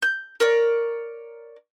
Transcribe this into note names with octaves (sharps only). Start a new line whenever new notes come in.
G6
A#4 C#5 D5